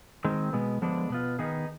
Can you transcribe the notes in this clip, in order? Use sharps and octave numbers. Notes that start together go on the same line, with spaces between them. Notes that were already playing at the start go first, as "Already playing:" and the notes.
D#3 G#3 C4
B2 G#3 B3
D3 F3 G#3 B3 D4
B2 B3 F4
D#3 B3 D#4 G#4